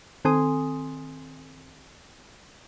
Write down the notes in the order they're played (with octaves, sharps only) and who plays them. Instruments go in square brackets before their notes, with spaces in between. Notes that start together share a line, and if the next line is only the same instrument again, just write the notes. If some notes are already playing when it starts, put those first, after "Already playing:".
[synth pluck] D#3 C4 A4 G#5 C6 D#6